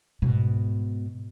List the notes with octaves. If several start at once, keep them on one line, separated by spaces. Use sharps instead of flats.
G#2 B2